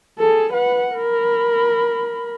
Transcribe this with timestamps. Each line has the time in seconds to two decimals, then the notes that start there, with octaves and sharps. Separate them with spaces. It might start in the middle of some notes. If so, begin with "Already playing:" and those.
0.19 G#4 A4
0.53 B4 F#5
0.94 A#4 B5